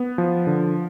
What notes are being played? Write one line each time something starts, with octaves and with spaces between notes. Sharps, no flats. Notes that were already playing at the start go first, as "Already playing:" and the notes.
Already playing: B3
F3
D3